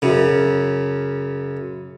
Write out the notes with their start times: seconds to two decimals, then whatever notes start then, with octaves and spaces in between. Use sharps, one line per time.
0.02 F#2 C#3